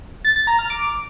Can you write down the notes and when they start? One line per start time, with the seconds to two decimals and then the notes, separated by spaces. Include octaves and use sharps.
0.25 A6
0.36 A6
0.47 A#5
0.59 F6
0.70 D6